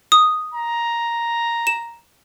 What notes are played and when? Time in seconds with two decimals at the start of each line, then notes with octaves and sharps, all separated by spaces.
0.12 D#6
0.54 A#5
1.67 E7